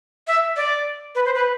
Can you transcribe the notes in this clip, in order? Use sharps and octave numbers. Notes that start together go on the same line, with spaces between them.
E5
D5
B4
C5
B4